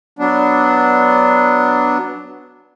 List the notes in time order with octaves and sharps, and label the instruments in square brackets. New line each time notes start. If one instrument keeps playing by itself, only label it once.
[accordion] F#3 B3 D4